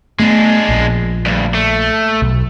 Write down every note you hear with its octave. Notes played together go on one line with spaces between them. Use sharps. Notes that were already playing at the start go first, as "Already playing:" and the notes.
G#3 A3 B3 D4
A#1
D2 G2
A3
B1